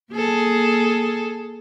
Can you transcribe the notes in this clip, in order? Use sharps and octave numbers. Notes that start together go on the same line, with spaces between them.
A#3 G#4 A4